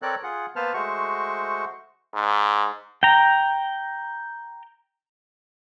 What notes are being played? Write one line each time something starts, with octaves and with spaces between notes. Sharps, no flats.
C4 A4 A#4 C#5 D5 F#6
F4 G#4 F#5
A#3 B3 B4 C5 A5 F6
G#3 A3 F#4 C5 C#6
G#2
G5 A#5